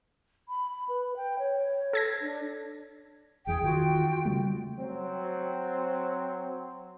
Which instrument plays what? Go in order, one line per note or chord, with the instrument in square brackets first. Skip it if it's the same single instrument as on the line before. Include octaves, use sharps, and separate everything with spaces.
[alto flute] B5
B4
G5
C#5
[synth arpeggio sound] A4 G#6 A#6
[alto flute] D4
[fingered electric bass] F#1 E2 [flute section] G#4 G5
[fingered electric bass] D#3 [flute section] F4 F#4 G5
[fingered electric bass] C#3 G3 A3
[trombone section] F#3 C4